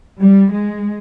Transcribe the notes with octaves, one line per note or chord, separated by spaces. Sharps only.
G3
G#3